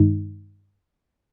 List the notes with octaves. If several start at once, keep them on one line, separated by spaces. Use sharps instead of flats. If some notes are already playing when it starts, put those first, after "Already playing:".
Already playing: G2 D#3 G#3 D#4